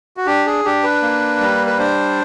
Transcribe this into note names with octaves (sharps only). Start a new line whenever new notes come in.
F#4
D4 G4
G#4
D4 G4
B4
A#3
G3
B4
D4 C5